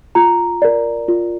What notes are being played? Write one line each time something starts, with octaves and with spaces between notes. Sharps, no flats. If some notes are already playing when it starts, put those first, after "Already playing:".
F4 A#5
A#4 D5
F4